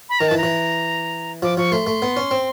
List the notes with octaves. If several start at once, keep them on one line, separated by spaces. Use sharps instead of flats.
B5
D#3 A#5
E3 A5
A#5
E3
F3 D6
F3 C#6
A3 C6
A3
B3
C#4
C4